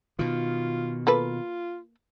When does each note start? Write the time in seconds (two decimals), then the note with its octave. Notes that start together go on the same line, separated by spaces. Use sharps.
0.19 B2 D#3 F4
1.07 A#3 F4 A4 B4